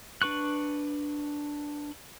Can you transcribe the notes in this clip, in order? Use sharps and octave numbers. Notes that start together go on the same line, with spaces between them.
D4 B4 C#6 F#6